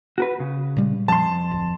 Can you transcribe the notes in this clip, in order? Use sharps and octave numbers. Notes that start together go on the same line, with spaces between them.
F#4 A#4 B4
C#3
A#2 G3 G#3
F2 A5 C6
D1